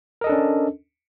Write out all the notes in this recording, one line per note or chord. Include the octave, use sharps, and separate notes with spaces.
C#4 D4 A4 A#4 D#5